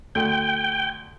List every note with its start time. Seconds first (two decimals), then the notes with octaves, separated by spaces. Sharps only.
0.15 D2 G5